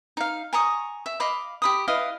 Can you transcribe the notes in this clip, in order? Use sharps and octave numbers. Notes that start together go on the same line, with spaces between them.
D#4 F5
G#5 A#5 C#6 D#6
E5
D#5 F5 B5 D6
G4 B5 D#6
E4 B4 D#5 F5